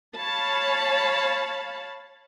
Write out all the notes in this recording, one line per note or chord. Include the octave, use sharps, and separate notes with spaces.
C#5 F5 A5 B5